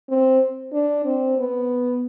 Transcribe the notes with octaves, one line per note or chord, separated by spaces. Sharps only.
C4
D4
C4
B3